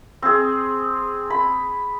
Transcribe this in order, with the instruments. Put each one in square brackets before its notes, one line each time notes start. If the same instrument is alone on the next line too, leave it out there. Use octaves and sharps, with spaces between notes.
[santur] C4 G#4
B5